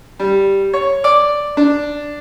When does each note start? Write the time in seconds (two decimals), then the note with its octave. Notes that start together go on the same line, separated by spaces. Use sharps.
0.19 G3
0.73 C#5
1.04 D5
1.57 D4